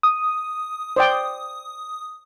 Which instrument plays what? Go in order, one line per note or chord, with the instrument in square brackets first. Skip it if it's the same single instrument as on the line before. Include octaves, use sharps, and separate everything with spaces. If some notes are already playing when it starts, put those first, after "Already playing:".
[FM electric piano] D#6
[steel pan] C5 D5 G5